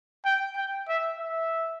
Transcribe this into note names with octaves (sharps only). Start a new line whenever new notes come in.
G5
G5
E5
E5